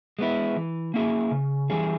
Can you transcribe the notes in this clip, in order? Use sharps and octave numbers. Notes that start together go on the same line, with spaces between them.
G#3 B3 E4
E3
A#3 C#4 E4 G#4
C#3
E3 G3 C#4 G#4